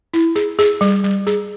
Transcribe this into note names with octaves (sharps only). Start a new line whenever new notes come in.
E4
G#4
G#4
G3
G3
G#4